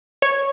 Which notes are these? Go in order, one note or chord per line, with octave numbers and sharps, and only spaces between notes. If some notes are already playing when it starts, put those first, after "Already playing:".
C#5